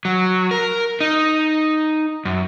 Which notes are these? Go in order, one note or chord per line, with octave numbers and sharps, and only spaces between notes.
F#3
A#4
D#4
F#2